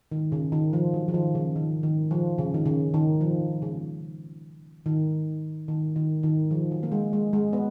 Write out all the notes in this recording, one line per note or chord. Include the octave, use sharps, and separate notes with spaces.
D#3
C#3
D#3
F3
F#3
F3
D#3
C#3
D#3
D#3
F3
C#3
D#3
C#3
D#3
F3
C#3
D#3
D#3
D#3
D#3
F3
F#3
A#3
G#3
G#3
G#3
B3